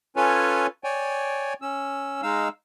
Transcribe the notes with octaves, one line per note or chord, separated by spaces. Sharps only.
C#4 F4 A4 B4 C#5 G#5
C#5 D5 G5 G#5
C#4 E6
G#3 D#4 F5 E6